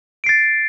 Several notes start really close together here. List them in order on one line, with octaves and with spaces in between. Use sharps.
D7 C7 A6